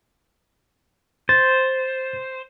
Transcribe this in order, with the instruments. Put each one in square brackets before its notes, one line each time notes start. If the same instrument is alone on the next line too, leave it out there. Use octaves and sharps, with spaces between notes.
[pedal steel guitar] C5 [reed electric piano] A6